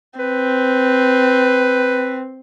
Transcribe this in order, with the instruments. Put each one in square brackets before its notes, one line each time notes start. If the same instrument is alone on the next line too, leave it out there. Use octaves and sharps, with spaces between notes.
[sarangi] C4 [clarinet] B4